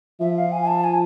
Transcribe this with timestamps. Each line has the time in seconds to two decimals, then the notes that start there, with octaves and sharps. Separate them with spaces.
0.20 F3 E5
0.37 F5
0.52 G#5
0.62 G#5
0.67 A5
0.84 G#5